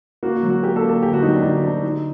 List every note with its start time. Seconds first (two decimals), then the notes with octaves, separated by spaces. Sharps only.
0.23 A#3 F#4
0.36 F#4
0.43 F#3
0.49 F#4
0.63 A#3 G4
0.76 A4
0.83 A#3
0.90 A4
1.03 D2 G4
1.13 F#4
1.23 F#3 D#4
1.33 D4
1.43 D2 D#4
1.64 D2 D4
1.84 D3 D#4